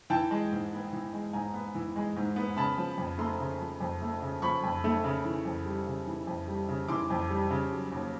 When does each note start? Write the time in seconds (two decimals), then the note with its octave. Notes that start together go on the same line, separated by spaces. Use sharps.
0.10 E3 G5 A5
0.31 G#3
0.52 G#2
0.73 B3
0.93 E3
1.13 G#3
1.33 G#2 G#5 A#5
1.54 B3
1.75 E3
1.96 G#3
2.16 G#2
2.36 B3
2.57 C#3 A5 B5
2.77 F3
2.98 F2
3.18 A3 A#5 C6
3.40 C#3
3.60 F3
3.80 F2
4.02 A3
4.22 C#3
4.42 F3 B5 C#6
4.63 F2
4.84 A3
5.04 C#3
5.25 E3
5.45 F2
5.66 G3
5.87 C#3
6.07 E3
6.27 F2
6.48 G3
6.69 C#3
6.88 E3 C6 D6
7.10 F2
7.30 G3
7.50 C#3
7.72 F#3
7.92 D#2